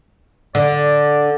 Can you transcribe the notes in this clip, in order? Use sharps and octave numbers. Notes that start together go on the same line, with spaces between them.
D3 D5